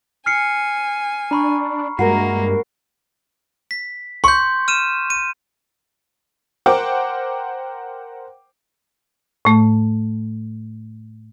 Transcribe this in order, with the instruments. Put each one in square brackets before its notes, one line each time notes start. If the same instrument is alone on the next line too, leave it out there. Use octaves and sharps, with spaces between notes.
[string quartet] G#5 [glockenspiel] F6 C7 C#7
[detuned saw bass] D4 [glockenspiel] A#5 B5 C#6
[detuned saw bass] G2 [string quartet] G#3 A#3 [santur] F#4 A#4 E5 [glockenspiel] C7
[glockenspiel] B6
[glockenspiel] C6 G6 [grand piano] C#6
[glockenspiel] F6 D#7 E7
D#7
[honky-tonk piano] A#4 C5 F#5 G5 D6
[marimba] A2 A3